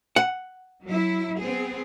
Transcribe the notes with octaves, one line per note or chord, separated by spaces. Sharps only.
F#5
F#3 E4
B3 C4 G#4